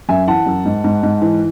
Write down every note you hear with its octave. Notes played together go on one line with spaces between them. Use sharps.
F#2 E5 G#5
E3 F#5 A5
F#2
G#2
G#2
G#2
E3